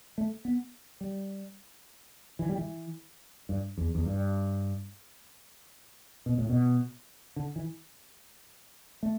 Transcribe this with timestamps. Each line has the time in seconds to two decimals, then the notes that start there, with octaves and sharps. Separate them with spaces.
0.18 A3
0.45 B3
1.01 G3
2.39 E3
2.49 G3
2.58 E3
3.49 G2
3.78 E2
3.95 E2
4.06 G2
6.26 B2
6.38 A2
6.50 B2
7.36 D3
7.56 E3
9.03 A3